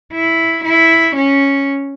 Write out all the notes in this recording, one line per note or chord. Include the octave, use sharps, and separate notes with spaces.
E4
E4
C#4